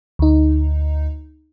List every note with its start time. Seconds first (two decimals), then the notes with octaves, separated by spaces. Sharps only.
0.19 D2 D#4